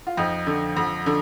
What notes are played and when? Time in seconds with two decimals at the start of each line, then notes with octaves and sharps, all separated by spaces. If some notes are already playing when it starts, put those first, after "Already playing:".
0.07 F4
0.17 F2 D#4
0.47 D3
0.77 F2
1.06 D3